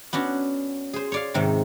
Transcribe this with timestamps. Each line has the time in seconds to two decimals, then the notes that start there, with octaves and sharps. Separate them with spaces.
0.13 B3 C#4 D4 F#4
0.93 G#4 C5
1.12 C#5 D5 F5
1.34 G#2 C3 D#3